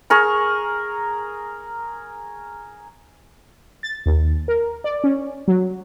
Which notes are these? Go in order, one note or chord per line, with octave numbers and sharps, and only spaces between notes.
G#4 A#4 C#6
A6
D#2
A#4
D5
C#4
F#3